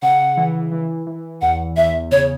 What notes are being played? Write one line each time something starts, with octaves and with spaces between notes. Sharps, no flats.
C#3 F#5
E3
E3
E3
E2 F#5
E2 E5
C#3 C#5